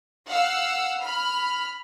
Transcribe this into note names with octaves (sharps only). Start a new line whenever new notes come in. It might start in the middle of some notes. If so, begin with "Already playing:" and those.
F5 F#5 E6
B5 F6